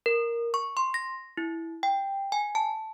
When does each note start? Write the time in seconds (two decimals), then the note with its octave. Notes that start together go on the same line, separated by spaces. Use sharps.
0.06 A#4
0.54 C#6
0.77 C6
0.94 A#6
1.37 E4
1.83 G5
2.32 G#5
2.55 A5